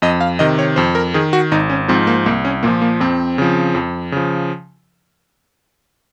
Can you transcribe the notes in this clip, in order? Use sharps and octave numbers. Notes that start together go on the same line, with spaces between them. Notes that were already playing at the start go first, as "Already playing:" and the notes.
F2 D#5
F5
C3 D#3 D#5
C#5
F2 C5
A#4
D#3 G#4
F#4
G#1 D#4
C#4
G#2 F3 C4
A#3
C2 A#3
C#4
A#2 F3 A#3
A#3
F2 C4
C#3 F3
F2
C#3 F3